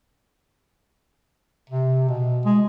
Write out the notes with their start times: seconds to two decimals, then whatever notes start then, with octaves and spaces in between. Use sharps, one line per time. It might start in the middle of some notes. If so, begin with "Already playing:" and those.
1.70 C3
2.09 B2
2.45 G#3